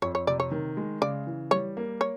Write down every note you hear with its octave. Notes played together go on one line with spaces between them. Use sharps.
F2 C#5
C#5
C3 D5
C#5
D#3
G#3
C#3 D5
E3
G3 C#5
A#3
C#5